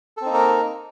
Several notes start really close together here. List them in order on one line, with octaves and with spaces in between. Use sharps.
A4 C4 D#4 A#3 A#4